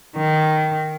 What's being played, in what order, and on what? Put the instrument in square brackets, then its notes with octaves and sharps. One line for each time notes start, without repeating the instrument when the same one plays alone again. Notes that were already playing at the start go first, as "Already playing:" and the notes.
[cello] D#3